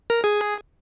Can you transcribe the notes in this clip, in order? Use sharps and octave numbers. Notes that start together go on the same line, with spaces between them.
A#4
G#4